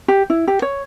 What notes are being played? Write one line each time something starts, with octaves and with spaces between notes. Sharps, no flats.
G4
E4
G4
C#5